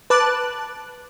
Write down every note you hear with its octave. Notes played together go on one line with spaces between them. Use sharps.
B4 A5 D6 F#6